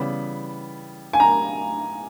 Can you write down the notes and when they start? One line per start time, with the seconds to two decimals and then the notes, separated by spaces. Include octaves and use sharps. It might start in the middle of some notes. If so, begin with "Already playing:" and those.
Already playing: C#3 E3 G3 B3 B5
1.13 G#5
1.20 A#5